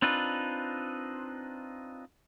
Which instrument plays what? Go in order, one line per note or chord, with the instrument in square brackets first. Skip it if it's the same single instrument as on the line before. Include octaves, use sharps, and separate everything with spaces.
[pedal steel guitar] C4 D4 D#4 F4 B4